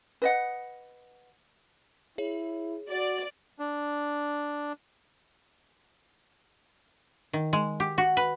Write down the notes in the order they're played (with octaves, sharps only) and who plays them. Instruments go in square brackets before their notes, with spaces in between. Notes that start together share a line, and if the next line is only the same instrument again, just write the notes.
[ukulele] B4 D#5 F#5
[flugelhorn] E4 [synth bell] G#4 C#5
[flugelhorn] F#4 [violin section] D5
[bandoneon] D4
[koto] D#3
G#3
G4
F#4
B4